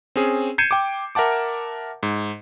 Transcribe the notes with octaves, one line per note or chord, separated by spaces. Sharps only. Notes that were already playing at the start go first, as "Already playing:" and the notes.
C4 C#4 G#4
G6 G#6 C7 C#7 D#7 E7
G5 D6
A#4 E5 F#5 A5 D6
G#2